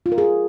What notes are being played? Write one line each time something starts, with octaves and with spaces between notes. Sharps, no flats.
F4
A#4
G#4